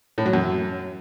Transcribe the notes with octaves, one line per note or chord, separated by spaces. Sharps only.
A2
F#3
F#2